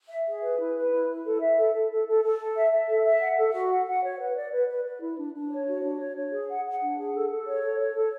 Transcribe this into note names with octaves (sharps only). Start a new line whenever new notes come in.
E5
G#4
B4
E4
B4
E4
E4
A4
E5
A4
A4
A4
A4
A4
A4
E5
E5
A4
E5
F#5
A4
F#4
F#5
F#5
C#5
B4
D5
B4
B4
B4
E4
D4
D4
C#5
F#4
D4
C#5
C#5
G#4
F#5
F#5
D4
G#4
A4
A4
C#5
A4
C#5
A4